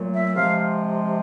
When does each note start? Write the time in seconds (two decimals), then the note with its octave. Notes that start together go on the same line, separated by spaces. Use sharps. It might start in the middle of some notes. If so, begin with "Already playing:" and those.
Already playing: A#2 F#3 A3
0.14 E5
0.36 C3 F3 G#3 F5